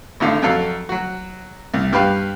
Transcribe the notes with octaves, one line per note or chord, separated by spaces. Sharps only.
G#1 A2 D3 F5
F2 F#3 A4 F5
F#3 F#4
C2
G2 G4 B4 F5 F#6